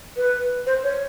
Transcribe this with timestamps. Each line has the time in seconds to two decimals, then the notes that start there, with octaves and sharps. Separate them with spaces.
0.17 B4
0.66 C5
0.84 C#5